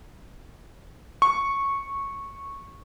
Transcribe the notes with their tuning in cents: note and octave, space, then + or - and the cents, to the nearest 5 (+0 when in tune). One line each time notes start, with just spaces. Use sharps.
C#6 -10